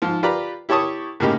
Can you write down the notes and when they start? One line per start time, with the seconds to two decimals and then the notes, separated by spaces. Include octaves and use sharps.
0.02 G#2 F3 F4
0.23 F4 G4 B4 D5 A#5 B5
0.69 E4 G4 C#5 A5 C#6 D#6
1.20 A2 C#3 A#3 D#4 G4